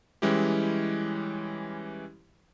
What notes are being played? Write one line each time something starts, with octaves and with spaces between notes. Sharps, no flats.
E3 G3 G#3 C#4 E4 G4